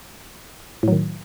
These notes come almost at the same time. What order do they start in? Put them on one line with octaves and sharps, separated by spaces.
A2 F#3 D#3